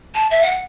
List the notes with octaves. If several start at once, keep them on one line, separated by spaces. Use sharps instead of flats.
A5
E5
F#5